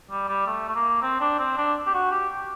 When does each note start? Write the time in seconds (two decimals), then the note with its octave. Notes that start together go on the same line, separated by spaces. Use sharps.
0.11 G3
0.28 G3
0.47 A3
0.69 A3
0.75 A#3
1.02 C4
1.20 D4
1.39 C4
1.57 D4
1.86 G4
1.94 F#4
2.11 G4